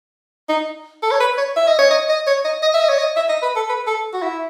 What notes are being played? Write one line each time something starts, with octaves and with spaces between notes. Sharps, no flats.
D#4
A4
C#5
B4
C#5
E5
D#5
C#5
D#5
D#5
C#5
D#5
D#5
E5
D#5
C#5
D#5
E5
D#5
B4
A4
B4
A4
F#4
E4